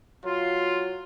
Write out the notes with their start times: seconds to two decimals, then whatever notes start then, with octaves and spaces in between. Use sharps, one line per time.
0.24 F#3 F4